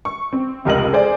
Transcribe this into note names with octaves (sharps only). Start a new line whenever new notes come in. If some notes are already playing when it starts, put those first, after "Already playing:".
C#6
C4
F1 C#2 A#4 D#5 F#7
G#4 A4 C5 D5 G#5